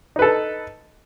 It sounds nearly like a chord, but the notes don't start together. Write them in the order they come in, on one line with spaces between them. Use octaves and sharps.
D#4 B4 A4